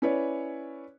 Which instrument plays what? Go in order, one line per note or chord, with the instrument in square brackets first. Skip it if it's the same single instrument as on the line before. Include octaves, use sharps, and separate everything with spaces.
[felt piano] C#4 E4 B4 C#5 D5